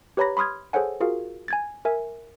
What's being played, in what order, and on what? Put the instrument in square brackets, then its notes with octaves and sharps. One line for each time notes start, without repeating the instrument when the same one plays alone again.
[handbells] G4 B4 C#5 A#5 B5 A#6
B5 C6 D#6 F6 G#6
G#4 A4 C5 C#5 F#5 G#5
F4 F#4 G#4 A#4 F5
G#5 G#6 A6
A#4 E5 G#5